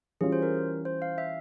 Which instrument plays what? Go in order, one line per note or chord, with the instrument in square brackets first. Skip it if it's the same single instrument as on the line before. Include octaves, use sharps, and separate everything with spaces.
[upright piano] E3 G3 C#4 F4 [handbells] G#4
[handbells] C5
A#4
C5
F5
E5